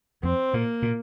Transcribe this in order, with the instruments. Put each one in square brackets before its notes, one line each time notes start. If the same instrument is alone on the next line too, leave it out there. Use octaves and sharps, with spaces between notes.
[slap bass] F2 [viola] C4
[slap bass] A#2 [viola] A#3
[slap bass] A#2